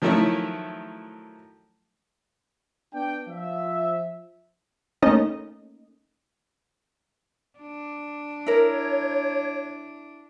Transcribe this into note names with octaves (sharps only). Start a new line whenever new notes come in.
D#3 F3 F#3 A3 C#4 E4
B3 D4 G5
F3 E5
A3 A#3 C#4 D#4 A4 D#5
D4
E4 A#4 C#5